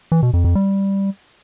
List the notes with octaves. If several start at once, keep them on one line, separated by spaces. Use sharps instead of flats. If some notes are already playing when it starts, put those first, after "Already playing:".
E3
B2
F2
F2
G3